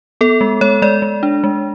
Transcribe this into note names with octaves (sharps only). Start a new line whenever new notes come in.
B3 A4
G#3
G#3 C#5
G#3 D5
G#3
D4
G#3